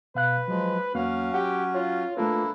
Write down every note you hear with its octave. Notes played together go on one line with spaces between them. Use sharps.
B2 B4 F5 F#6
F3 F#3 G#3
E2 F#3 A#3 C#4 F#4 F5
G4 F#5
F4 C#5
A3 A#3 D4 E4 F4 A4 B4